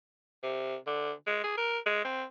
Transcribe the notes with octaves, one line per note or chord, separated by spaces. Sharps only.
C3
D3
G#3
G#4
A#4
G#3
C4